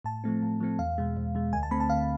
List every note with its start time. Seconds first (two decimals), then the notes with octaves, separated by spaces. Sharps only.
0.04 A2 A5
0.24 F3 A3 C4
0.43 A2
0.60 F3 A3 C4
0.79 E2 F5
0.98 B2 G#3
1.17 E2
1.35 B2 G#3
1.53 D2 G#5
1.63 A5
1.71 D3 A3 C4 B5
1.80 A5
1.90 D2 F5